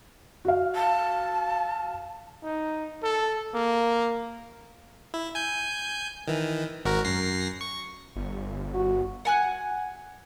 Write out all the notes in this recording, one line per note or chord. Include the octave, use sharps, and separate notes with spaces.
F#4 F5
A5
D#4
A4
A#3
E4
G#5 G6
D#3 E3
G#1 F#4 A#4
F#2 A#6 C7
C#6
G1
F#4
F#5 G#5 F#6